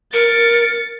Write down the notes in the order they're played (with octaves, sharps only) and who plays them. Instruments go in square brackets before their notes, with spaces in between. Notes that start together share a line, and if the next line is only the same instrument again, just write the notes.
[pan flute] A#4 [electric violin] A6 C#7